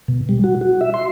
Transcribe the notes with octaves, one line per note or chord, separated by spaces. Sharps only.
B2
G3
F#4
F#4
E5
C6